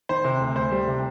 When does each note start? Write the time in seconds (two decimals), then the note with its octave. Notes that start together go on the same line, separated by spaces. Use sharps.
0.09 D#3 C5
0.25 C3
0.41 D2
0.56 D2 C5
0.71 G3
0.87 C3